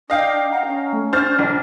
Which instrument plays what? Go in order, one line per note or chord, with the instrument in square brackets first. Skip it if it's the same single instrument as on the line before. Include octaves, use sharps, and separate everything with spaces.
[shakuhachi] D4 [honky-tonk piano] D#5 F5 G5
[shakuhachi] F#5 [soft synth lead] A#5
[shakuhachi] C#4
[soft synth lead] A3
[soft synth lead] D4 [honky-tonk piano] C5 F6 A6
[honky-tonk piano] A#1